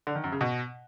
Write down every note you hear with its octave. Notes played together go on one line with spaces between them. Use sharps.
D3
D#3
F#2
C#3
B2